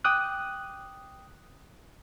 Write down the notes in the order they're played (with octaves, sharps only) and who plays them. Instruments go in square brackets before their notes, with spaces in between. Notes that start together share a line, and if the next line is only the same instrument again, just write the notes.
[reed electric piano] G5 D6 D#6 F#6